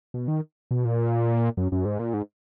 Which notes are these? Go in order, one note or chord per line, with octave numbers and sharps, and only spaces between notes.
B2
D#3
B2
A#2
F#2
F#2
G#2
A#2
G#2